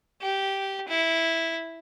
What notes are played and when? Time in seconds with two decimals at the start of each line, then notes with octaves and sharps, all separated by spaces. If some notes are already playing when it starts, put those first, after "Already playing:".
0.22 G4
0.88 E4